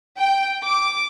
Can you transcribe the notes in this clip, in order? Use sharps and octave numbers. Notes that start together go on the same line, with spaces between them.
G5
D6